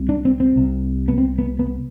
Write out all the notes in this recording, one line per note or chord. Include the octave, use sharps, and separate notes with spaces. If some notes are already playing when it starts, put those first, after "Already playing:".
Already playing: C2 C3
D4
C4
C4
C2 C3
B3
C4
B3
B3